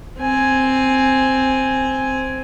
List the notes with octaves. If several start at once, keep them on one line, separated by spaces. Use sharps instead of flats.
C4 G#5